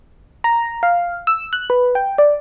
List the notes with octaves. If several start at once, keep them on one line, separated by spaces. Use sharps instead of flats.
A#5
F5
E6
F#6
B4
G5
D5